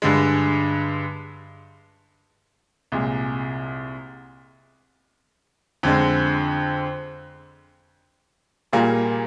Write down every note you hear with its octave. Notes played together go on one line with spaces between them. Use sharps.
G2 D3 G#3
C2 A#2 G#3
F2 D3 G#3
A#2 G3 A#3 F4 G#4